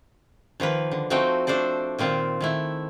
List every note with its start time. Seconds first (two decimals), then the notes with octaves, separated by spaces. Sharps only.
0.60 D#3 F3 A#3 B4
0.91 D3
1.10 F3 A3 C4 D#4 F#4 G5
1.47 A3 D4 A4 C5 D5
1.99 A#2 D#3 C4 F4
2.41 D#3 A3 E4